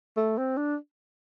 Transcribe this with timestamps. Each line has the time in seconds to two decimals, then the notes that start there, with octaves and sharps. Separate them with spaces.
0.17 A3
0.38 C4
0.57 D4